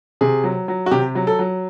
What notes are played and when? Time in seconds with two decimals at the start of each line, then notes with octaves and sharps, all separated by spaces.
0.21 C3 G#4
0.44 F#3
0.68 F#3
0.86 F#4
0.91 C3 G4
1.15 F#3
1.27 A4
1.39 F#3